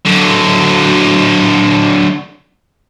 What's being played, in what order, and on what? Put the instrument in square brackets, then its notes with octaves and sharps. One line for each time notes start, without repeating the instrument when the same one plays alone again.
[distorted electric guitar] D3 F#3